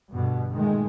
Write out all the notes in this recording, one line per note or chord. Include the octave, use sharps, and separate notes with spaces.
G2 B2 D3
A#2 D#3 G#3 A3